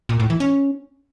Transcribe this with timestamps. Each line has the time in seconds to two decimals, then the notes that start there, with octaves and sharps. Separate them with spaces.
0.09 A#2
0.20 A2
0.30 E3
0.40 C#4